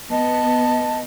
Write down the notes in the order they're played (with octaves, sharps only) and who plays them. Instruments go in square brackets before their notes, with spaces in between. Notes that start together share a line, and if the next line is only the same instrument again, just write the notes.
[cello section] B3 [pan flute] D#5 [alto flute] A5